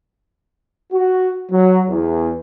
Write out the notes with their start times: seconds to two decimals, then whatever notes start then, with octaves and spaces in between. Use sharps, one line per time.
0.92 F#4
1.51 F#3
1.90 E2